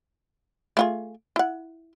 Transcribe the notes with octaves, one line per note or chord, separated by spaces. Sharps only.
A3 F4 G#4
E4 F#5